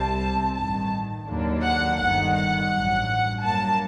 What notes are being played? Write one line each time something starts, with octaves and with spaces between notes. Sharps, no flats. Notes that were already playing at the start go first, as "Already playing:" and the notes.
Already playing: C2 C3 G3 C4 A5
A1 G2 D#3 A5
D#2 D3 F#3 A#3 D4
F#5
G1 G2 D#3 F#5
F#5
A1 G2 F#3
G2 F#3 A#3 A5